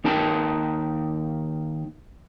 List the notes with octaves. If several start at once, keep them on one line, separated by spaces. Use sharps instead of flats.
D#2 D#4 A#4 G5 A5